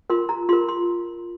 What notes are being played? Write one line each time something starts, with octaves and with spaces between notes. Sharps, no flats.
F4 A#4 C6
A#5
F4 A#4 C6
C6